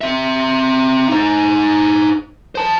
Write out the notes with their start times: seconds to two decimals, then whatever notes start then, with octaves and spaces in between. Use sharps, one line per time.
0.01 C4 E5
1.09 D#4 C5
2.55 C5 A5